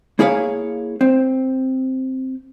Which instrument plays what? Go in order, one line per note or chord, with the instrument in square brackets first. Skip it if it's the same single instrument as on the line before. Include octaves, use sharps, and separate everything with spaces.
[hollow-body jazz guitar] A#3 E4 G#4 C#5 F5
C4